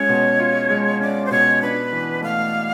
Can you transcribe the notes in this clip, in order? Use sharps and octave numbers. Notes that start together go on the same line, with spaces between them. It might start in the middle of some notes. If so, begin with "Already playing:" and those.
Already playing: G#3 C#4 F4 C#5
B2
F4
G#3
C#4 D5
C5
B2 C#5
D4 B4
E3
A3 F5